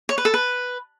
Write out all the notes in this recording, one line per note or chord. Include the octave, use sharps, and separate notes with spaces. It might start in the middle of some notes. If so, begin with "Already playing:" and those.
C#5
B4
A4
B4